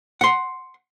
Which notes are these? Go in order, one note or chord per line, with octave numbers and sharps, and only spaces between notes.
F#5 C6